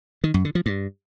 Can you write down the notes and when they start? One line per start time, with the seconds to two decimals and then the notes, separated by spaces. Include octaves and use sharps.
0.24 D#3
0.34 F#2
0.45 D3
0.55 F3
0.66 G2